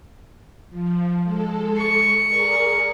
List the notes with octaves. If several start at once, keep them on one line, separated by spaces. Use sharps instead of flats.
F3
G#3 A4
C#6
G#4 A#4 D5